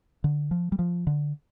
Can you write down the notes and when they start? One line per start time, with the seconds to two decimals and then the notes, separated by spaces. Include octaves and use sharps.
0.24 D3
0.51 F3
0.72 G3
0.79 F3
1.07 D3